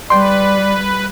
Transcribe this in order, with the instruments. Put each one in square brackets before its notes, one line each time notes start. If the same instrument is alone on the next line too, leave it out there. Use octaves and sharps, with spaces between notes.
[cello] G3 [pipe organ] B4 [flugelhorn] D5 [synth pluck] G5 C6